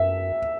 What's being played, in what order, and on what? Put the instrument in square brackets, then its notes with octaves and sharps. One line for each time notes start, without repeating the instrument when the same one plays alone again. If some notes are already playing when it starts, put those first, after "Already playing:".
Already playing: [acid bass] F#2 [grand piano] E5